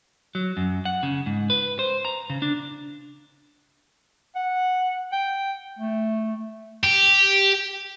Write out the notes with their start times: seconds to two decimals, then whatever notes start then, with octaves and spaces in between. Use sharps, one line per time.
0.35 F#3
0.57 F#2
0.85 F#5
1.03 C#3
1.26 G#2
1.50 B4
1.79 C5
2.05 A#5
2.30 C#3
2.42 D4
4.36 F#5
5.12 G5
5.79 A3
6.84 G4